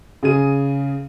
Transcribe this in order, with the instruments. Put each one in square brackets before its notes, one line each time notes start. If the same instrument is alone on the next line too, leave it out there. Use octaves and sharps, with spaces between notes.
[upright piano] C#3 G#4 D#7